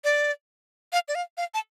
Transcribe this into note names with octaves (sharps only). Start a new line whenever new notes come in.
D5
F5
D5
F5
F5
A5